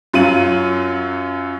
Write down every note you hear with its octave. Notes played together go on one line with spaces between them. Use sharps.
F#2 F#3 F4 D#7 F#7